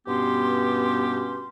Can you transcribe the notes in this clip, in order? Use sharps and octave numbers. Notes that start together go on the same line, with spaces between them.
G2 B2 B3 C#4 G4 C6